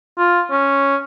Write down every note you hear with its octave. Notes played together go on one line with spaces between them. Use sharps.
F4
C#4